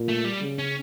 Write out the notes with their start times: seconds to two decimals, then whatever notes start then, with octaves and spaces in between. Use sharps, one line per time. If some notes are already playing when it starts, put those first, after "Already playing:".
Already playing: A#2
0.08 A3
0.25 G3
0.42 C#3
0.59 C#4